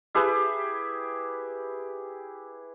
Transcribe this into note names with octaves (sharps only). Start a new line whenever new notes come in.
E4 G4 G#4 B4